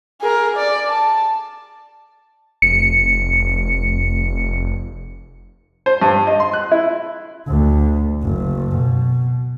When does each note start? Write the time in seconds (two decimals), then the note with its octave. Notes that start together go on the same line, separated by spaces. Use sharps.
0.21 G#4 A#4
0.57 D5
0.87 A5
2.62 F1 C#7
5.86 C5
6.02 G2
6.27 D#5
6.40 C6
6.53 F#6
6.72 E4
7.48 D2
8.23 F#1
8.76 B2